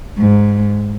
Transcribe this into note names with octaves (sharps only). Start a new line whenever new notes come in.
G#2